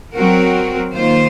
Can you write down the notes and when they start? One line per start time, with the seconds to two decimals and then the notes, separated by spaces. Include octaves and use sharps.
0.15 F#3 C4 F#4 A#4
0.93 D#3 A#3 F4 C5